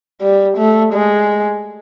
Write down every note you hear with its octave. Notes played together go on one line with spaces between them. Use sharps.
G3
A3
G#3